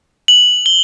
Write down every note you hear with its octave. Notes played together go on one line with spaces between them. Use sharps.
F#7
G7